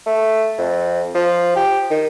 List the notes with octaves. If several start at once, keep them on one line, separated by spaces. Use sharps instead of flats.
A3
F2
F3
G4
D#3